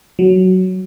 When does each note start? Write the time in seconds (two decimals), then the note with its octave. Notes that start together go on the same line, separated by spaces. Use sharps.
0.19 F#3